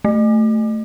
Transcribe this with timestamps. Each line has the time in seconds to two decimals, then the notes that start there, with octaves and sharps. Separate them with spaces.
0.05 A3